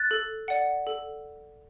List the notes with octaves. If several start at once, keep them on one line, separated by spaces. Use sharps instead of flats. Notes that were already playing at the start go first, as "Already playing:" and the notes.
Already playing: F#6 A6
A4
D5 F#5
A4